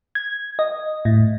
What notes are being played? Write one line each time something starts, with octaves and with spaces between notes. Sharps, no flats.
G#6
D#5
A2